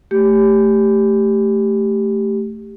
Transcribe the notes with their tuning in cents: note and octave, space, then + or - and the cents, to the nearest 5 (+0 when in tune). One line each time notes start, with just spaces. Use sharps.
A3 +0 G4 +0